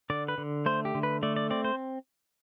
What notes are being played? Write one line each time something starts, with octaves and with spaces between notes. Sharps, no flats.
D3 D5
B4
D3
A3 C5
G4
D3
B4
A3 D5
D5
C4 D5
C5